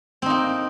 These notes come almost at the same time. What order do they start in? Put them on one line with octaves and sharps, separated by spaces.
C4 D#4 A#3